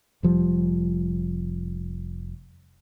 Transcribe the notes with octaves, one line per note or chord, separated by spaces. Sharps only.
F1 F3 G3